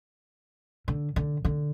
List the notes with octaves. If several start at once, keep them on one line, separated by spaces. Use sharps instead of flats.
D3
D3
D3